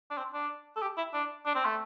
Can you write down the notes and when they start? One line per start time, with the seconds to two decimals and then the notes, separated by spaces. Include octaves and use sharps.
0.10 D4
0.17 C4
0.33 D4
0.76 A4
0.82 G4
0.97 E4
1.14 D4
1.46 D4
1.55 C4
1.65 A3